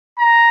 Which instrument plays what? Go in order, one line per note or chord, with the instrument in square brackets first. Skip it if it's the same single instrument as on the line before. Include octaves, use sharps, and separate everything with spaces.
[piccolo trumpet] A#5